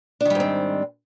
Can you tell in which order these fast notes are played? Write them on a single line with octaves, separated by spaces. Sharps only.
D4 D#3 G3 G#2 C4